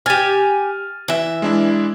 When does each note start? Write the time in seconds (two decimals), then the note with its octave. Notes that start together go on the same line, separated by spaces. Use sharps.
0.06 G4 G#5 F6 A6 D#7
1.08 E3 E5
1.42 G#3 D4 E4